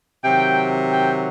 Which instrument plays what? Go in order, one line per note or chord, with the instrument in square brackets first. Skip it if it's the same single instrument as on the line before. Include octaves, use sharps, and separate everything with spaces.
[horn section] C3 D#3 F#3 G5
G5